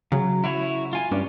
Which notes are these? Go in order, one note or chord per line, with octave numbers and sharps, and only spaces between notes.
C#3 F#3
E4 F#4 C#5
F4 G#5
G2 C#4 D4